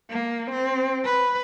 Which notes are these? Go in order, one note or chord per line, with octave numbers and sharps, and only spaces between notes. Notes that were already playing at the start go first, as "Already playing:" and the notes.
A#3
C4
B4